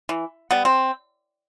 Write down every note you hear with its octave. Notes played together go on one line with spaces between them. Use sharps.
E3
G3 B3
C4